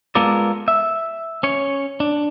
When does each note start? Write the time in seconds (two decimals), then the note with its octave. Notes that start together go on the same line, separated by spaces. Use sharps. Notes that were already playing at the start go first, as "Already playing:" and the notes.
0.15 G#3 B3 F4 A4 A#4 D5
0.68 E5
1.43 C#4 C#5
2.00 D4